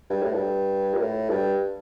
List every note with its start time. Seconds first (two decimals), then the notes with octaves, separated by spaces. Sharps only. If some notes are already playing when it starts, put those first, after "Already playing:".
0.10 G2
0.22 A2
0.34 G2
0.94 A#2
1.00 A2
1.30 G2